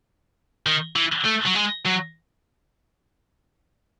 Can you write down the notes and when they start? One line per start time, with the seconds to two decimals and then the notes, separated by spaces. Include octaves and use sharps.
0.67 D#3
0.96 E3
1.26 A3
1.47 F#3
1.56 G#3
1.86 F#3